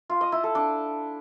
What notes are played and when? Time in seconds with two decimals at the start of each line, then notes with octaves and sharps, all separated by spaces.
0.10 F4
0.21 D#5
0.32 E4
0.44 A4
0.55 D4